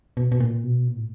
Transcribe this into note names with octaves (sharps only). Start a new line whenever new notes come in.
B2
B2
A#2
B2
A#2
A2